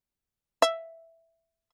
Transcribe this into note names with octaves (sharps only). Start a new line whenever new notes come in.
E5